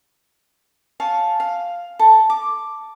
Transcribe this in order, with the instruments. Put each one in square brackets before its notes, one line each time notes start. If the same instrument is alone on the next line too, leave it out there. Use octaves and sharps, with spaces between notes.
[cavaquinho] C#5 F5 G#5 A5
F5
A4
D6